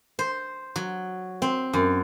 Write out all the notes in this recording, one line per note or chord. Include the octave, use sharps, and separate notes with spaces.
C5
F#3
C4
F#2